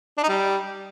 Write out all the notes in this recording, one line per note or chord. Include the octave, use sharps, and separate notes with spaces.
D4
D#4
G3